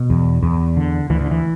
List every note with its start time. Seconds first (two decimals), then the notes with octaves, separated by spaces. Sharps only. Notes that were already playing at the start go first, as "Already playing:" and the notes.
Already playing: B2
0.10 E2
0.43 E2
0.77 D3
1.10 D2 E3
1.21 D3
1.31 E3